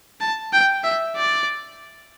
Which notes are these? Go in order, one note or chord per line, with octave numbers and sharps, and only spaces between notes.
A5
G5
E5
D5